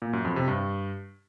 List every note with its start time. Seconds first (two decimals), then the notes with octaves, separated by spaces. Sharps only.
0.02 A#2
0.13 F#2
0.25 F2
0.36 C3
0.48 G2